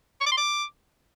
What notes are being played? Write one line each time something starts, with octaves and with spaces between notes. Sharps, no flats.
C#6
D6
C6
D6